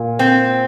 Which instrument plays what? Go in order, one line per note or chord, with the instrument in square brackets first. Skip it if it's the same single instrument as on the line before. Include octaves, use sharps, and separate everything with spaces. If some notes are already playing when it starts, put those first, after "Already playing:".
Already playing: [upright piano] A#2
[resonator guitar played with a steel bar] C4